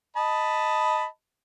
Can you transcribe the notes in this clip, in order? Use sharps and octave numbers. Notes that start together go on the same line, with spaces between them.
D#5 A5 B5